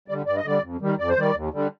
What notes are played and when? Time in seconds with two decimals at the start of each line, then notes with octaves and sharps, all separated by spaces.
0.08 G3 D5
0.11 D3
0.26 G2 D5
0.36 D#5
0.44 D3 G3 D5
0.62 F2
0.81 D#3 G3
0.98 F2 D5
1.09 C5
1.17 D#3 G3 D5
1.35 D#2
1.53 D3 G3